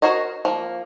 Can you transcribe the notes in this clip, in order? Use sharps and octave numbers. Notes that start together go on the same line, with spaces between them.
F#4 A#4 C5 C#5 D#5
F3 G#3 A#3